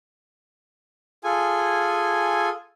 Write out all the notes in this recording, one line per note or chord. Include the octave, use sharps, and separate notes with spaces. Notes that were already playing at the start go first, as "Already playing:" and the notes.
F4 G#4 A4 G#5